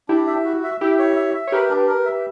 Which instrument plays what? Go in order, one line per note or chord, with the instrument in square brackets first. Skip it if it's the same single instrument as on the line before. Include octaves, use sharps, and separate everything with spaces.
[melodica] D4 [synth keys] E4 G4
[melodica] E5
F#4
E5
[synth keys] E4 G4 [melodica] E5
[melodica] C#5
E5
E5
[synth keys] C#5
[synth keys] G4 B4 [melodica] A#4
[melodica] D4
A#4
E5